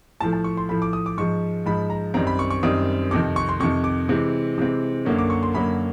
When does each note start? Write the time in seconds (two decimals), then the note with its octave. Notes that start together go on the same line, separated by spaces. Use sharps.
0.20 A2 F3 A3 A5
0.33 A5
0.44 C#6
0.57 C6
0.69 A2 F3 A3 B5
0.82 D6
0.93 D#6
1.06 D6
1.18 G#2 F3 G#3 C#6
1.66 G#2 F3 G#3 B5
1.90 A#5
2.14 F#2 D#3 G3 C4 A#5
2.27 B5
2.39 C#6
2.51 C#6
2.63 F#2 D#3 G3 C4 D#6
3.11 F2 C3 D#3 D6
3.36 C#6
3.49 C6
3.60 F2 C3 D#3 C#6
3.84 D6
4.09 C3 E3 G#3 C4
4.58 C3 E3 G#3 C4
5.05 F#2 D3 F#3 A#3 C#4
5.18 D6
5.30 C#6
5.43 C6
5.54 F#2 D3 F#3 A#3 C#4 B5